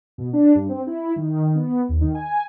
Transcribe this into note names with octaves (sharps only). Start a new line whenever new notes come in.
B2
D4
G2
C4
E4
D#3
B3
D#2
D#3
G#5